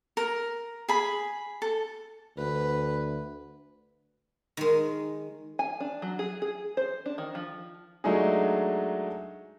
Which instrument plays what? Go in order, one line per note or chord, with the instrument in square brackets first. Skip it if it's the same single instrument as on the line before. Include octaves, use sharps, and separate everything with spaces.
[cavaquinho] A#4
G#4 B5
A4
[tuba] D2 [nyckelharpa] B4
[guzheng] D#3 G#3
[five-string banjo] G#5
D4
F#3
G#4
G#4
C5
D4
D#3
F3
[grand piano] F#3 G#3 A3 D4 D#4 G#4